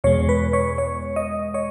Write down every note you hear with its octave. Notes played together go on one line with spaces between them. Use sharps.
E2 B2 G#3 C#5
B4
C#5
C#5
D#5
C#5